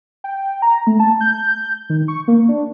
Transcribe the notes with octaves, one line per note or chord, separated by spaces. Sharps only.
G5
A#5
A3
A5
G6
D#3
C#6
A#3
D4